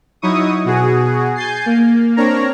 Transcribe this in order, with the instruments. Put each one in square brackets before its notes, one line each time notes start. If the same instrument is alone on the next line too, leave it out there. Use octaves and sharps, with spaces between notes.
[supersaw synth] F#3 D#4 E4 C#6 D#6
B2 F#4 G#4
G#5 G6 A6 C7
A#3
C4 D4 A#4 C#5 A#5